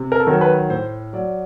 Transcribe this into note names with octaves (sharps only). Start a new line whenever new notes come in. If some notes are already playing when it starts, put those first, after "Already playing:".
Already playing: C3
A#4
A4
D#3 F#3 A#4
B4
A2 C5
F#3 D5